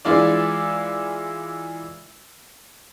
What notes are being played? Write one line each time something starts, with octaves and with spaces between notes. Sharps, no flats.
E3 G#3 E4 F4 D5